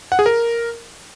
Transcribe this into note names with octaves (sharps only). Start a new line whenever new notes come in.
F#5
G#4
A#4